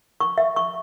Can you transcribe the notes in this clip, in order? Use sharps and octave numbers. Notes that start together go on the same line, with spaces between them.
C#6
E5
C#6